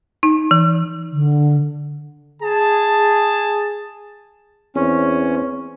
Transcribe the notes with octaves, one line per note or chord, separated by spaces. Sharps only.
D#4
E3
D3
G#4 A5
E2 C4 C#4